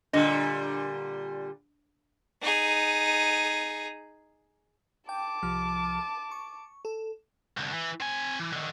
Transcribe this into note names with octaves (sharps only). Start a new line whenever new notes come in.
A#2 D3 G3 D4 D#5 A#6
D#4 G#4
G5 A5 D6
C2 F3 F6
C#6
A4
C2 D3
E3
C4 G#5
E3
D3 D#3